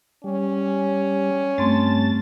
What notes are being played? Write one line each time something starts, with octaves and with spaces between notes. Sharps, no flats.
G3 C#4
G2 A3 C4 A5 A6